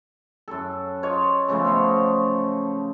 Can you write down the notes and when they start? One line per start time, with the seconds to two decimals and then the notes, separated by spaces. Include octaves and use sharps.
0.48 F#2 A4
1.03 F4 C#5 D#5
1.48 C#3 F3 A3 B3
1.65 C#3 C5 C#5 D#5